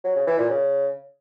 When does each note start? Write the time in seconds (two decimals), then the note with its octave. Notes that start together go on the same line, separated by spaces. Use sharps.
0.04 F#3
0.16 C#3
0.27 E3
0.38 A#2
0.50 C#3